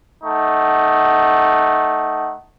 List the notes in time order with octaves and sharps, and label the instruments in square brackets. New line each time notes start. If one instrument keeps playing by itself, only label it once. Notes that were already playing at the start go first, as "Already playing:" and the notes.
[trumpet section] A3 D#4 F#5